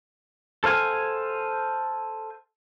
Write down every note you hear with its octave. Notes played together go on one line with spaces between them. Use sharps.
A4 C5 F5 G#5